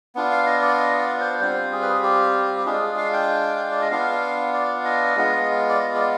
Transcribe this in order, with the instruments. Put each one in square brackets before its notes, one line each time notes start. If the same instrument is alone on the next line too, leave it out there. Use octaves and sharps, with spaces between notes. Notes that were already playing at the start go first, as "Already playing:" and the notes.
[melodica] B3 D4 F4
F5
D#5
D5
D#5
D5
C5
G3 C4 F4 C5
G#4
B4
G#4
G4
G4
G#3 D4 F4 G#4
G#4
F5
G5
D5
D#5
B3 D4 F4 F5
D5
D#5
G#3 B3 F4
D5
D#5
D5